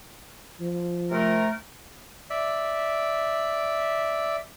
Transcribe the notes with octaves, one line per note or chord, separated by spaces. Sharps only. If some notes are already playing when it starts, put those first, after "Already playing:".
F3
C3 A3 A#4
D5 E5